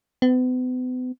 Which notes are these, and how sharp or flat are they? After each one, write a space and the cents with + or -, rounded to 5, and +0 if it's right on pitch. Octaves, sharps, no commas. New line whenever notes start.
B3 +40